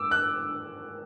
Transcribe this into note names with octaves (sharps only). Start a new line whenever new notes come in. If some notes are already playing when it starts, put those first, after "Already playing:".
Already playing: D6 E6
F#6